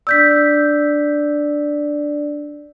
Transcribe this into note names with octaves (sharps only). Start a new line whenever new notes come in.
D4 D5 E6 G6 B6